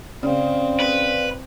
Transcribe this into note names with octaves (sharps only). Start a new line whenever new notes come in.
C#3 C4 D5 F5
B4